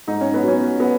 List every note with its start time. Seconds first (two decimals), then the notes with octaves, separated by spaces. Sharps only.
0.07 G#2 D#4
0.21 C#4
0.34 B3
0.43 F#3 C#4
0.80 B3